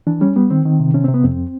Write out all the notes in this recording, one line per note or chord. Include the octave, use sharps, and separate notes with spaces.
E3 D4
G3 C#4
G3 B3
D#3 C4
D#3
C3
C3 C#4
C3 C4
B3
F2 C4